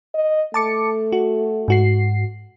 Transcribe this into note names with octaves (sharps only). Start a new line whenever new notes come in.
D#5
A3 A5 D6 C#7
F#4
G#2 F#4 C7